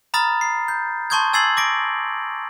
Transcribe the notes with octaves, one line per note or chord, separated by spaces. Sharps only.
A#5 B5 D#6 F6 A6
C7
G6
A5 C6 C#6 D#6 G6 G#6
G#5 E6 G#6 A6 C7 F#7
D6 A#6 D7